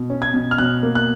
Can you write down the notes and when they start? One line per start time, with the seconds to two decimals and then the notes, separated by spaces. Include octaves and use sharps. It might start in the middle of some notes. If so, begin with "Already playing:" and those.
Already playing: B2
0.10 C#4
0.22 G#6
0.34 B2
0.51 F6
0.58 B2 F#6
0.83 A#3
0.95 F#6